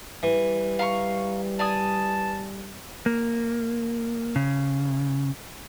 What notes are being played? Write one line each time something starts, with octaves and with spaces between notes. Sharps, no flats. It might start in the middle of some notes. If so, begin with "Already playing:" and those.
E3 G3
F5 A#5 C#6
D5 G#5 A5 D#6
A#3
C#3